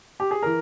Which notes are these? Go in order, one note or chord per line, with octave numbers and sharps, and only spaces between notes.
G4
G#4
E3 A#4